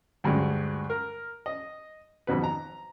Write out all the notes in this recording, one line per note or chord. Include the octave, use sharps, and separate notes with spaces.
D2 G2 F#3 G#3
A#4
D#5
G#1 F2 B2 B4
A#5